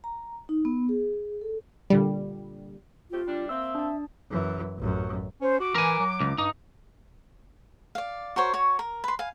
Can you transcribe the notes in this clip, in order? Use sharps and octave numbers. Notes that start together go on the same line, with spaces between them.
A#5
D#4
B3
G#4
A4
A#2 D3 G3
A3 C4 F4 G4
G3 D4
A#3 C4 E5 E6
D4 A5
F#2 E3
A1 F#2
C#4 C5
F#4 D6
E3 A#4 G#5
F#3
C#2
G2 D#4
D5 F5
F#4 A#4 C5 C#5
F#4 C#5
A#4
B4 C6
F5 G#5